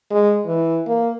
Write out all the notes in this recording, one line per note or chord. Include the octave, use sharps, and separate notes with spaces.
G#3
E3
A#3